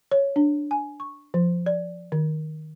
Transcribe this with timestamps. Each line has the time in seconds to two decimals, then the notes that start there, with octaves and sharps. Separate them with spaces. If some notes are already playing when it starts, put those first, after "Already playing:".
0.11 C#5
0.36 D4
0.71 G#5
1.00 C#6
1.34 F3
1.66 D5
2.12 D#3